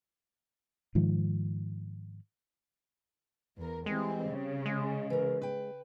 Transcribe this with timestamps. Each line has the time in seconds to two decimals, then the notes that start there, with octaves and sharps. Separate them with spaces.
0.95 G#2 D#3 F3
3.57 E2 A#4
3.86 E3 G3 G#3 C4
4.30 C#3
4.66 G#3
5.10 E3 A#4
5.42 B4 G5